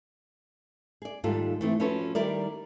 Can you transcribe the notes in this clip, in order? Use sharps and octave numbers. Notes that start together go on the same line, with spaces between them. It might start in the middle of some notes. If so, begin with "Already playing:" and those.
G#4 D5
D#2 G#2 G3 F4 A4
E3 A3 C4
F3 C#4 F#4 A4 B4 C#5
D#3 G3 E4 A#4 D5